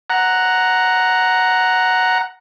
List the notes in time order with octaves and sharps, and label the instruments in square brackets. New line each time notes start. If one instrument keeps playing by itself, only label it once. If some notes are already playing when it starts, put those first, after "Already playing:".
[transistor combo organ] F#5 A#5